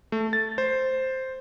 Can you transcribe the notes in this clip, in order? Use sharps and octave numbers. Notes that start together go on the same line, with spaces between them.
A3
A6
C5